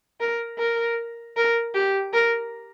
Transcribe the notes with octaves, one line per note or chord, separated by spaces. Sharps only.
A#4
A#4
A#4
G4
A#4